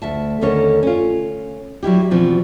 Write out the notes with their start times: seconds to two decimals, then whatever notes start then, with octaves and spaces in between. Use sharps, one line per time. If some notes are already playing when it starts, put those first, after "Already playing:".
0.02 D2 E5 A5
0.41 D#2 D3 C#4 A4 A#4 C#5
0.83 C#4 F4
1.83 F#3 G3 E4 G4
2.11 B2 E3 F3 C4 D4